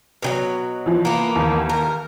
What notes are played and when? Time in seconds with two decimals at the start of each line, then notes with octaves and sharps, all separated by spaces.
0.22 B2 D#3 F#3
0.86 E3 F3
1.05 A#3 B3
1.36 D#2 E3
1.69 A#4